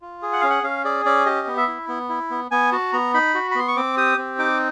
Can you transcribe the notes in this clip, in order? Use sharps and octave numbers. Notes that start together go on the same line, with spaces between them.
F4
G#4
F#5
C#4 F5
F#5
C#4 F5
G#4 D5
C#4 D5
G4 D#5
B3
E5
E4
B3
E4
B3
B3 G#5
F#4 A5
B3 A#5
D#4 B5
F#4
B5
B3 C6
C#6
C4 D6
G4 D#6
C4
D#4 D6